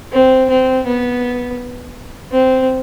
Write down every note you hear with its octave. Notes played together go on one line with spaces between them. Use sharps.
C4
C4
B3
C4